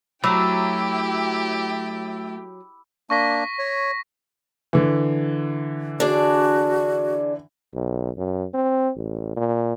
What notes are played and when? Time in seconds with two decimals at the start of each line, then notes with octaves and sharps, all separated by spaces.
0.24 F#3 A3 E4 G4 G5 B5 D6 E6
3.10 A#3 D4 C#6 A#6 B6
3.59 C#5
4.73 D3 E3
6.00 D4 F#4 G#4 D5
7.74 B1
8.18 F#2
8.54 C4
8.96 A1
9.36 A#2